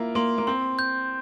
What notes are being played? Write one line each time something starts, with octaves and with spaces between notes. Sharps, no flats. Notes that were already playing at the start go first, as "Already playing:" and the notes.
Already playing: A#3 E4 F4
A#3 C6
A#3
C4 C6
G6